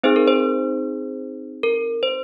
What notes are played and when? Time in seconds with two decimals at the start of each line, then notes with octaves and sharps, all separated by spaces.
0.03 C4 D#4 G#4 C5
0.16 A#4
0.28 C5
1.63 A#4
2.03 C5